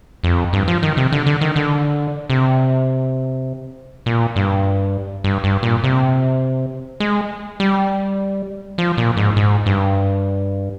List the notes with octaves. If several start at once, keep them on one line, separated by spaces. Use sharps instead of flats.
F2
G2
F3
D#3
C3
D3
D3
D#3
D3
C3
A#2
G2
G2
G2
A#2
C3
G#3
G3
F3
A#2
G#2
G#2
G2